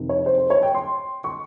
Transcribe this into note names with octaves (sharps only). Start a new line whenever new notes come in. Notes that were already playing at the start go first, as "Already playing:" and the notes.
Already playing: F2 C3 D#3
C#5
C5
C5
C#5
G5
C6
C#6